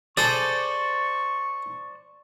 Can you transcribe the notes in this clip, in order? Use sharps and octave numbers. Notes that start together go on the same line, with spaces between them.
G#4 A4 C5 D5 C#6